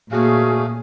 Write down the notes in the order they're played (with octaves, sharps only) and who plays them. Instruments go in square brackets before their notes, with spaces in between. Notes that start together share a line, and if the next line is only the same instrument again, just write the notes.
[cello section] A#2 [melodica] A3 C#4 F5 [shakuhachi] F#4 [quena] G#4